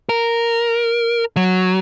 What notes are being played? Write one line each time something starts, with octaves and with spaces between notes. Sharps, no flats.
A#4
F#3